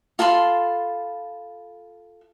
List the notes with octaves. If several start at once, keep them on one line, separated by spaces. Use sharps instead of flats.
F4 A4 B5 C6